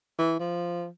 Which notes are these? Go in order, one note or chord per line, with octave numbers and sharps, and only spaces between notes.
E3
F3